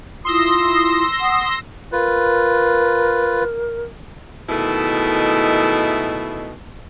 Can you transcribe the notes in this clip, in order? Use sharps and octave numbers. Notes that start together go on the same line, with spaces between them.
E4 F4 C6 D#6 E6 A#6
F#5 D#6
F4 A#4 B4
B2 D#3 G#3 A3 E4